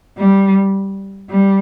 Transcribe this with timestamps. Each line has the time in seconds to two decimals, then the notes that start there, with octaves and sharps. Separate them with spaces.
0.18 G3
1.30 G3